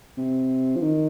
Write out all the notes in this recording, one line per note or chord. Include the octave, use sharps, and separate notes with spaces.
C3
F3
D#3